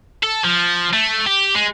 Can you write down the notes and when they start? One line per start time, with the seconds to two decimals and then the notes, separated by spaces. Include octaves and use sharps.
0.23 A4
0.45 F3
0.93 A3
1.26 G4
1.55 G#3